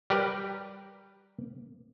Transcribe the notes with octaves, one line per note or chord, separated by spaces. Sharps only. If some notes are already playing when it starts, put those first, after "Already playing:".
G3 G4 A#4 B4